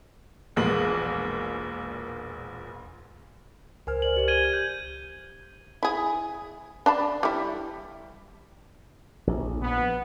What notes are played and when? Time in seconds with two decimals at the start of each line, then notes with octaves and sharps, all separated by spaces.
0.56 E1 A#1 A#2 G#3 B3 F#7
3.87 C#2 A#4 C5 G#5 F6
4.02 C5 D5 F#7
4.17 G4 D5
4.28 G#6 D#7 G7
4.53 G6
5.83 E4 G#4
6.86 D4 A5 B5
7.23 G3 E4
9.27 A#1
9.63 B3